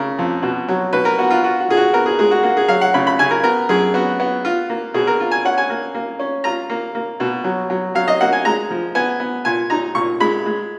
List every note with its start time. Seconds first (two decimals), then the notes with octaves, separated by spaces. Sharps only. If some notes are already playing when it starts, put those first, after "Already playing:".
Already playing: C#3 A#4
0.19 F2
0.42 B2
0.68 F#3
0.93 B2 B4
1.05 A#4
1.18 B3 F#4
1.30 F4
1.44 F4 F#4
1.60 F#4
1.68 A#2 G#4
1.77 F#4
1.93 B3 A#4
2.06 G#4
2.19 G#3 G#4
2.31 F#4
2.43 A#3 F#4
2.57 G#4
2.68 F#3 F5
2.81 F#5
2.94 C#3 B5
3.07 B5
3.19 C#3 G#5
3.31 A#4
3.43 B3 A#4
3.69 F#2 G#4
3.94 B3 F#4
4.20 B3
4.45 F4
4.70 A#3
4.94 B2 G#4
5.07 A#4
5.20 F4
5.31 G#5
5.45 C#4 F#5
5.58 G#5
5.70 A#3
5.95 A#3
6.19 C#4
6.44 F4 A#5
6.70 A#3
6.95 A#3
7.20 B2
7.44 F#3
7.70 F#3
7.95 F#3 F5
8.08 D#5
8.21 A#3 F#5
8.33 G#5
8.45 G#3 A#5
8.70 F3
8.95 B3 G#5
9.20 B3
9.45 A#2 G#5
9.70 D#4 A#5
9.95 A#2 C#6
10.20 G#3 B5
10.46 G#3